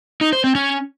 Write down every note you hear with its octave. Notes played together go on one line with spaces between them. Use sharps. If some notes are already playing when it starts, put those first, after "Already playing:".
D#4
C5
C4
C#4